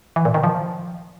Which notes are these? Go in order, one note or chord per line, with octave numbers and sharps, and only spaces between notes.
E3
A#2
D#3
F3